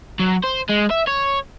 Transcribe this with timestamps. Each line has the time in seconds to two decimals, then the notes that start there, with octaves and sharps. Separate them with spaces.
0.19 F#3
0.44 C5
0.69 G#3
0.90 E5
1.07 C#5